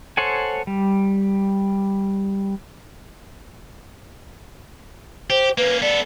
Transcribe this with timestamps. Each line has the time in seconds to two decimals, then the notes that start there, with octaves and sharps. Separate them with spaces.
0.17 A4 C5 C#5 F#5 G#5
0.67 G3
5.30 G4 C5
5.58 A#3 C#4 B4
5.82 B3 A4 D5